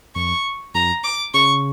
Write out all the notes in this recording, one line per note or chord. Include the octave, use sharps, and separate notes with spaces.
F2 C#6
F2 A#5
D6
C#3 C#6